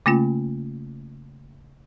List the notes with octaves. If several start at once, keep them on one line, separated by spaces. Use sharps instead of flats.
C#3 A3 A#3 C#4 F4